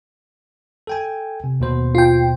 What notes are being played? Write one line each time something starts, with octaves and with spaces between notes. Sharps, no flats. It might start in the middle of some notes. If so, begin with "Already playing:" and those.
A4 G5 G#5
C3
D#2 B2 C5
F4 G5